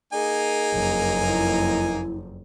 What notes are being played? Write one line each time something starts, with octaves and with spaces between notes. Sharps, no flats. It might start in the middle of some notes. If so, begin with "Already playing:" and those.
A#3 D#4 G#4 G#5
F#1 F2
E4